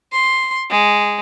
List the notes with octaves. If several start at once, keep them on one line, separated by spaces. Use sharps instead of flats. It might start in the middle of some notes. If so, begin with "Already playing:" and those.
C6
G#3